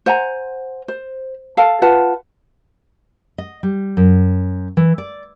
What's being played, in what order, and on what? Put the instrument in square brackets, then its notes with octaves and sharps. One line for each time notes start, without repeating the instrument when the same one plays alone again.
[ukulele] C5 F#5 G#5 A#5
C5
A4 F5 A5
F4 B4 F#5 A5
[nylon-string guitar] D#5
G3
F#2
E3
D5